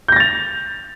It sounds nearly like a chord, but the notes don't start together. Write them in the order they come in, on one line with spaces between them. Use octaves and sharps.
G6 A#6 A6 F7